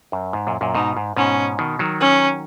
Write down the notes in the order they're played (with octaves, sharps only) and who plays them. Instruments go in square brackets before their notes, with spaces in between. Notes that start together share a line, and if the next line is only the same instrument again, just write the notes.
[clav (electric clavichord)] F#2
G#2
F#2 A#2
F#2 A#2
[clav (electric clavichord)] G#2 B2 [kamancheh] D#4
[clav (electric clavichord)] G#2
[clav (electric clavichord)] G#2 B2 [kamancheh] C#4
[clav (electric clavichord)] B2 D#3
D#3 F#3
[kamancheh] C#4